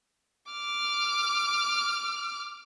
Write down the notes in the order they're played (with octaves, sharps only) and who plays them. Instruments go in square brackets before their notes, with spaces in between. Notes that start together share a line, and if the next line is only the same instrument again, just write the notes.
[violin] D6 F6